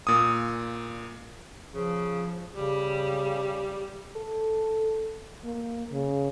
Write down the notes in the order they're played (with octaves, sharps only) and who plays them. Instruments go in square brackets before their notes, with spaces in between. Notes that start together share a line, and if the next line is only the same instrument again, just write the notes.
[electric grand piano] A#2 D#6
[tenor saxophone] C#3 [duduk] F3
[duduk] C#3 [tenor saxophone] G3
[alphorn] A4
A#3
C#3